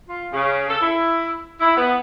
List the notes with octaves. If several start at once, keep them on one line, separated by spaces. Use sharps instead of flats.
F4
C#3
A4
E4
E4
B3